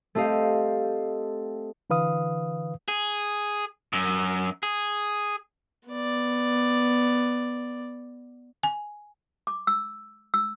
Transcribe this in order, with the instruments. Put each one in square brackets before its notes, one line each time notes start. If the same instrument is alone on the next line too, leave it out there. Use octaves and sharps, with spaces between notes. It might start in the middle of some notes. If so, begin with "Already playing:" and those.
[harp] A3 C4 G4 D#5 F5
[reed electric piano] D3 E3 B4 F5 D#6
[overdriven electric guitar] G#4
F#2
G#4
[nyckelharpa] B3 D5
[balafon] G#5
[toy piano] D6
E6
E6